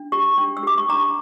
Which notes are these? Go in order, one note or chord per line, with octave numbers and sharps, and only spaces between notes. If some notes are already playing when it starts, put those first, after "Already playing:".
Already playing: D4
G4 C#6
D4
E6
G4 D6
C#6
D4 A#5